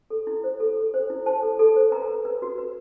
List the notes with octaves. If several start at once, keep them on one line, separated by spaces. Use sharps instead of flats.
A4
E4
C5
A4
A4
C5
E4
C5 A5
A4
A4
C5
B4 A#5
B4
B4
F#4
B4